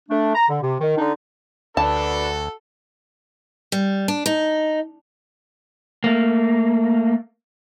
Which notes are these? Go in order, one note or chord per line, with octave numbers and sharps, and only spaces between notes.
A3 D4
A#5
D3
C3
D#3
D3 D4 D#4
D2 D4 F#4 A4 B4 A5
G3
D4
D#4
A3 A#3